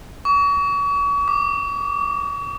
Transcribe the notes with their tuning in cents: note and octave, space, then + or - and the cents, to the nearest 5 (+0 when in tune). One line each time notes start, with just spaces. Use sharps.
C#6 +40
D6 +5
D6 -40